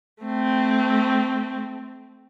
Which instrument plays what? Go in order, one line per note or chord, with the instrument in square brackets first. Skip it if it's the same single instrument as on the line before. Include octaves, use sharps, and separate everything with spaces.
[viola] A3 C4